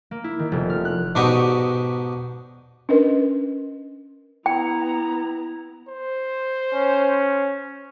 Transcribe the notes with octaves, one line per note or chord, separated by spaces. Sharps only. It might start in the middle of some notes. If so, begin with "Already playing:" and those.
A#3
E4
D#3
F1
F6
F#6
G#2 B2 D4 D#4 G4 C#6
C#4 D4 A#4 B4 D#5
B3 E4 G5 A#5
C5
C#4